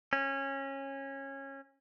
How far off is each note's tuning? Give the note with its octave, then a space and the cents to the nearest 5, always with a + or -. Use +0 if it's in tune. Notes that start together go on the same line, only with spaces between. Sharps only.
C#4 -20